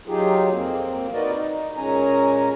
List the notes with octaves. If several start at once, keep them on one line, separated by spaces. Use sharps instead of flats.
F#3 D#4 F4 G4 G#4
F2 A#3 C4
D#4 F#4 A#4 B4 D5 D#5
D#4
A#2 G#3 C#4 G#5 A#5